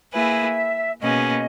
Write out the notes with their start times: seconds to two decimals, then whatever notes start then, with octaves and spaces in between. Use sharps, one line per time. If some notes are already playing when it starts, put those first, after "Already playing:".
0.14 A#3 E4 G#4 B4 E5
1.01 B2 A#3 C#4 G#4 B4 D#5